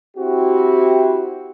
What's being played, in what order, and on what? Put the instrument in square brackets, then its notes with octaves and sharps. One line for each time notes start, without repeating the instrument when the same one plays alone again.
[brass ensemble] C4 E4 F#4 G4